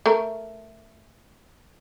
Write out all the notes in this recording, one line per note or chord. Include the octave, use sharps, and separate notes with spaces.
A3 A#4